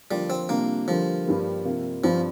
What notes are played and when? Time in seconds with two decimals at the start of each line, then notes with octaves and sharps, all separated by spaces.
0.11 D3 F3 G3 A#3 F4
0.30 C4
0.49 C3 G3 A#3 D4 F4
0.88 D3 F3 G3 A#3
1.26 G2 G3 A#3
1.65 C3 A#3 F4
2.03 G2 F3 G3 C4 F4